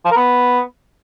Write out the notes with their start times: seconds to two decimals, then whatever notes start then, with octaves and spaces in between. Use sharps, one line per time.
0.05 F3
0.11 A#4
0.17 B3